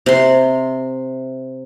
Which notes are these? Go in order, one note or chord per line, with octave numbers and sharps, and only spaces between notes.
C3 C6